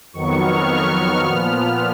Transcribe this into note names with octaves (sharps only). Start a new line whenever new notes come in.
F2 D#3 F#3 B3 C#6
F6
A#2 F3 B3